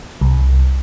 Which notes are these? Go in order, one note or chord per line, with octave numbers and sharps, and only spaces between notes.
C2